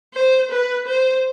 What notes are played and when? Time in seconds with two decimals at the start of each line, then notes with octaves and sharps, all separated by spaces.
0.14 C5
0.51 B4
0.87 C5